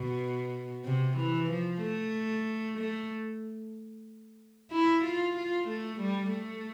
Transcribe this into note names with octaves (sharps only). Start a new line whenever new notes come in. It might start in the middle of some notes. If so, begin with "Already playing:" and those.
Already playing: B2
C3
E3
F3
A3
A3
E4
F4
F4
A3
G3
A3